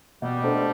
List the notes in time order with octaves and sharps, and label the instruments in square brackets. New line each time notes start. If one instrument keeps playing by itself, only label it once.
[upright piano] B2 [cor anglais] G3
[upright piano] A3 D4 A4 C5